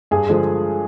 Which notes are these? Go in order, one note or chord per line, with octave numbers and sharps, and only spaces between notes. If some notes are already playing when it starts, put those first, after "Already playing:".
G2 G#4
D3 F3 G#3